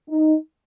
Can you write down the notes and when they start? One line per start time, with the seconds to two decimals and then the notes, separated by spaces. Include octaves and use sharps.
0.09 D#4